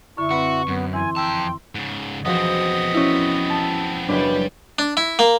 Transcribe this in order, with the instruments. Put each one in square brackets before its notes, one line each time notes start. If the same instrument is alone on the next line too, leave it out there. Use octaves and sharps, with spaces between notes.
[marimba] F#2 D3 [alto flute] E4 [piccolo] C#6
[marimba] C4 B4 B5 [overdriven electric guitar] F#4
[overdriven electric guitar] F#2 [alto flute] B3
[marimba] E3 E4 [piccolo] G#5 [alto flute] C6
[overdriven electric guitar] F2 A5 [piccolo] G5 [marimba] A#5 E6
[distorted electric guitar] G#2 C#3
[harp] E1 F3 F#4 [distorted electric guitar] B3 C4 [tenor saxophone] D#5
[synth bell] C#4 E4
[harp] A5 E6
[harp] F#1 B4 G#6 [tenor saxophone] B2 [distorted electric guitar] G3 G5 [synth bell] D4
[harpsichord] D4
E4
A#3